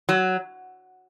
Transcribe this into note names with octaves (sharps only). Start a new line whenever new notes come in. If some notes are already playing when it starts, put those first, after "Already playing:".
F#3